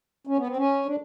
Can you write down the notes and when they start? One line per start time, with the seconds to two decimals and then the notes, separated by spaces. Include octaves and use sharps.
0.27 C#4
0.37 B3
0.47 C4
0.57 C#4
0.86 D4